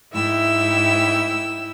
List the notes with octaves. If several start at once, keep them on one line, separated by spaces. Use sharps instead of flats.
G#2 E4 E5 G5 E6